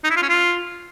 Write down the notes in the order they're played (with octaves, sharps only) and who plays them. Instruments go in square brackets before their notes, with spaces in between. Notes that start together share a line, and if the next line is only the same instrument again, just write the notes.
[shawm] D#4
E4
F4
C#4
F4